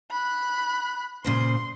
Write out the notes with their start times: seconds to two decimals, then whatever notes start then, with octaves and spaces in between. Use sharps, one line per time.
0.10 B5 F#6
1.24 A#2 C#3 C5 C6